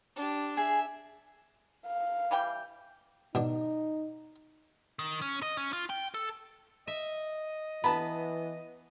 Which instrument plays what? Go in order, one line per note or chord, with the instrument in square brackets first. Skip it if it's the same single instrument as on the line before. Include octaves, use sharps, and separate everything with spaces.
[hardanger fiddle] D4 G4
[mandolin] G#4 [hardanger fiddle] E5
[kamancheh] F5
[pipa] E3 G3 G5
[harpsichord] B2 D4 [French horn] D#4
[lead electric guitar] D#3
C#4
D#5
C#4
F4
G5
A4
[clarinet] D#5 [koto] E5
[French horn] E3 [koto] B3 [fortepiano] A5 B5